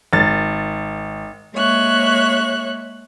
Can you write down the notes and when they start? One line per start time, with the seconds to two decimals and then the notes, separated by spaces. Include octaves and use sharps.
0.13 G#1 A6
1.54 G#3 A#3 C#5 E5 F#6